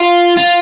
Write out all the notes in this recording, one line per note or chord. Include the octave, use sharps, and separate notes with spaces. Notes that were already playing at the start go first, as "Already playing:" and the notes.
Already playing: F4
F4